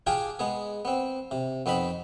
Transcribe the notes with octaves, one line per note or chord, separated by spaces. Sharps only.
D4 F4 G4 G#4 G5 G#5
G#3 B3 G#4
B3 C4
C3
F2 B3 C4 D#4 B5